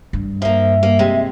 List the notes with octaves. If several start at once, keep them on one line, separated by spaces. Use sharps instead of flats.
G2
F3 A#3 E5
A#3
C3 G#3